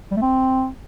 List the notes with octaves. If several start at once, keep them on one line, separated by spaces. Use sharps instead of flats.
G3
A3
C4